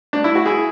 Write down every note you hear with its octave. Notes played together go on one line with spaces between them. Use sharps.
D4
E4
F#4
E4 G#4